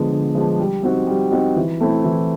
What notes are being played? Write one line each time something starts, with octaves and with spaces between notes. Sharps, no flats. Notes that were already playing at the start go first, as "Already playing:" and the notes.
Already playing: D3 F3 G#3 B3 D4
D3
F3 G#3 B3 D4
G3
C4 D#4 F#4
G3
C4 D#4 F#4
E3
A3 C4 E4
E3